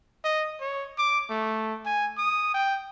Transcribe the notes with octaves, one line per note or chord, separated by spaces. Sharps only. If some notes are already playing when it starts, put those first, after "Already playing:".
D#5
C#5
D6
A3
G#5
D#6
G5